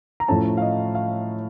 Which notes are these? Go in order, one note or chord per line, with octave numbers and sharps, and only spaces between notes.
A#5
A2 F3 A3 C#4 A5
F5
D#5
F5